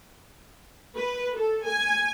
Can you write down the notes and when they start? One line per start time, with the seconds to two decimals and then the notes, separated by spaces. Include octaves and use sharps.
0.96 B4
1.35 A4
1.65 G#5